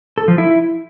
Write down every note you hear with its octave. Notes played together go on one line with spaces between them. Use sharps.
A4
F3
E4